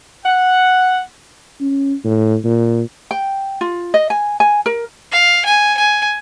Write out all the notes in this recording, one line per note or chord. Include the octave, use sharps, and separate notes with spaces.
F#5
C#4
A2
A#2
G5
F4
D#5
G#5
G#5
A#4
F5
G#5
G#5